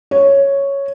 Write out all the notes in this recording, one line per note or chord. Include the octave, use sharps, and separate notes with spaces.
C#5